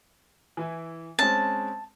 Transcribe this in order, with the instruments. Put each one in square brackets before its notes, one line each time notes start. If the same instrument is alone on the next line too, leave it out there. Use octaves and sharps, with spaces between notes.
[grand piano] E3 E4 G#5
[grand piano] G#3 C4 C#4 [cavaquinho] A5